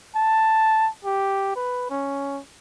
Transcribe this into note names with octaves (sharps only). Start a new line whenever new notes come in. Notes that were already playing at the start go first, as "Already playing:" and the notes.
A5
G4
B4
C#4